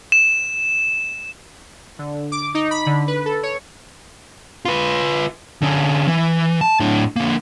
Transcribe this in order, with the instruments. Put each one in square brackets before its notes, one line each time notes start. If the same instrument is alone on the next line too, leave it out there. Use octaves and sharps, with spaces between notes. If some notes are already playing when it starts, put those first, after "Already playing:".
[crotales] E7
[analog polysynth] D3
D6
D#4
B5
D3
B4
A4
C#5
[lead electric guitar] F4 B4
D3 C#4
E3
A5
A2 D4
D3 A#3